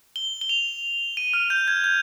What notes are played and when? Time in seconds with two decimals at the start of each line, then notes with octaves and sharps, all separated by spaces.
0.16 G7
0.41 G7
0.49 F7
1.17 D#7
1.34 F6
1.50 G6
1.68 G#6
1.84 G6